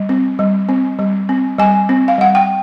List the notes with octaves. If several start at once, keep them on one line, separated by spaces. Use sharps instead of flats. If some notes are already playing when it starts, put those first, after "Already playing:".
Already playing: G3
C4
G3
C4
G3
C4
G3 G#5
C4
F5
G3 F#5
G5